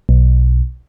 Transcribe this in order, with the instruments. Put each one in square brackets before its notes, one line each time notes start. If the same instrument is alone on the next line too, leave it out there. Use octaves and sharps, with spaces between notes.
[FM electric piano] B1